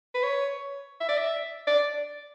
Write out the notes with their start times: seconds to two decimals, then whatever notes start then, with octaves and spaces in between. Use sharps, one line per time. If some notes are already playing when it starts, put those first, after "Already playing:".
0.14 B4
0.23 C#5
1.00 E5
1.08 D5
1.18 E5
1.67 D5